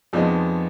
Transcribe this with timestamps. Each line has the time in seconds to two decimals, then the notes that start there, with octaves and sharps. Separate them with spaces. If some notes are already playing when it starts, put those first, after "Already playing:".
0.13 F2 F3 G#3 B3 D#4